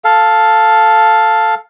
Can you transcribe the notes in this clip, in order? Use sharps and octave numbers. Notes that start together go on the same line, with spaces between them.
A4 F5